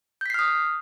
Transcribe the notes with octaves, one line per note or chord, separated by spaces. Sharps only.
D#6 F6 G6 B6 C7